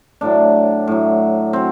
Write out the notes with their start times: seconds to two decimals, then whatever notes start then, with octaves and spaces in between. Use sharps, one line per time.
0.21 A2 F#3 D4
0.87 A2 F#3
1.53 F#3 C4